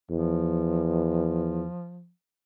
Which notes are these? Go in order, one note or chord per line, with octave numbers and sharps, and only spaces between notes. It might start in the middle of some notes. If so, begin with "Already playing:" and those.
E2 F3